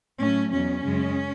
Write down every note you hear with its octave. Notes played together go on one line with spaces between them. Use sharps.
A2 F#3 A3 C#4
E2 B2 F#3 C#4
F#2 C#3 G#3